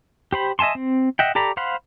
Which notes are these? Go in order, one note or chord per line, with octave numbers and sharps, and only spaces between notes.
G4 C5 B5
D#5 E5 G#5 A5 C6
C4
D#5 E5 F#5 G5
G4 A4 D5 A#5 B5
C5 F5 F#5 B5 C6